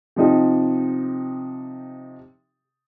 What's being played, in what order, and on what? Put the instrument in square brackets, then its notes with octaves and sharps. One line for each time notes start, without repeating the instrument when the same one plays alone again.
[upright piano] C3 F3 D#4 G4